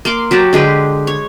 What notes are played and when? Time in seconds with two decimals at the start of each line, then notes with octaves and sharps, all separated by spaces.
0.05 A#3 C6 D6
0.31 F#3 G4 F#5 A5
0.53 D3 G#3 G4 B4
1.07 C#5